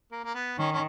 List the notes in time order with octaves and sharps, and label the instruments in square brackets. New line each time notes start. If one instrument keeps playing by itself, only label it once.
[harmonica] A#3
A#3
B3
[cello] D#3 [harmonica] C#4
[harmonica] C#4